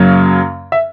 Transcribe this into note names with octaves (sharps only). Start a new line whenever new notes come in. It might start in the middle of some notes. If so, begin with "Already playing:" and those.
Already playing: F#2 C#3 F#3 A#3
E5